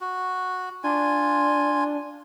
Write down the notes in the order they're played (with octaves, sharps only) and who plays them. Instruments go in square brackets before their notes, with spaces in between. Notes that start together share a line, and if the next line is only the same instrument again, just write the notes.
[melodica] F#4
[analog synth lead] D4 [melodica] F4 G#5